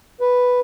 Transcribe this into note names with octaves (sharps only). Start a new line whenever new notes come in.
B4